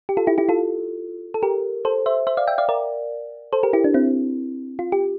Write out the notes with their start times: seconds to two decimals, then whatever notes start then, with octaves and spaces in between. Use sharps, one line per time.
0.09 G4
0.17 F4 A4
0.27 E4 G4
0.38 E4 G4
0.49 F4 A4
1.34 A4
1.43 G4 A#4
1.85 A4 C5
2.06 C5 E5
2.27 C5 E5
2.37 D5 F5
2.47 E5 G5
2.58 D5 F5
2.69 A#4 D5
3.53 A4 C5
3.63 G4 A#4
3.73 E4 G4
3.84 D4
3.94 C4 E4
4.79 F4
4.92 G4